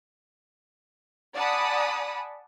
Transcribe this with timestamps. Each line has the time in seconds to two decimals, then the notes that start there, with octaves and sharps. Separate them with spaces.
1.34 D5 F#5 G#5 A5 B5 D#6